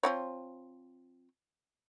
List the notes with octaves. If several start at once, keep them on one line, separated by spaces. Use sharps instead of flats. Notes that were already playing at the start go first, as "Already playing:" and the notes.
F3 C4 C#5